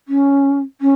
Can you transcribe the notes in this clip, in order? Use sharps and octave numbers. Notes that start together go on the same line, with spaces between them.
C#4
C#4